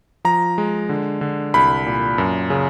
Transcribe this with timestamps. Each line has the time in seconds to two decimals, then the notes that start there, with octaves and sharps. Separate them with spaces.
0.25 F3 A#5
0.58 G#3
0.89 D3
1.21 D3
1.54 C2 B5
1.86 A#2
2.18 F#2
2.50 C#3